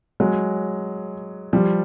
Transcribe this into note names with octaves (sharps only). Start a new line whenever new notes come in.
F#3 G#3
F3 G3